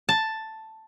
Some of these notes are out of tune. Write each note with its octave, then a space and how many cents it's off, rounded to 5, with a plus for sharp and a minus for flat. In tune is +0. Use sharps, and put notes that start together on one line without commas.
A5 +5